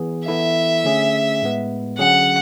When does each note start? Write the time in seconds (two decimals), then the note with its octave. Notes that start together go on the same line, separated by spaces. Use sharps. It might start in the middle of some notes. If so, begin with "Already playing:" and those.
Already playing: E3 B3 G#4
0.27 E3 B3 E4 A4 E5
0.84 D3 A3 C#4 G#4
1.42 A2 G#3 B3
1.99 D3 F#3 C#4 G#4 F#5